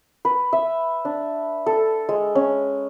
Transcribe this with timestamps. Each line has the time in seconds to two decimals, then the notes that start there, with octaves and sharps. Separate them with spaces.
0.25 B4
0.53 E5
1.05 D4
1.66 A4
2.09 G#3
2.35 C#4